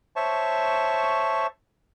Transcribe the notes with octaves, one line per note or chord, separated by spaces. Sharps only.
C5 C#5 E5 A5 C#6